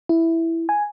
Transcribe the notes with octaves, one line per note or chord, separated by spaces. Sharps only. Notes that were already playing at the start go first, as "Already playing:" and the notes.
E4
G#5